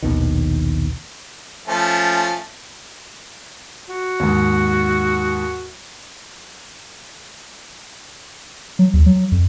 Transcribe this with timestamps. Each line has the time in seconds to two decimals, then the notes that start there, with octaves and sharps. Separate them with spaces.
0.03 A#1 D#2 B2 D#3
1.68 F3 A3 C#4
3.89 F#4
4.20 D#2 G#2
8.79 F#3
8.94 D#2
9.06 F#3
9.32 F2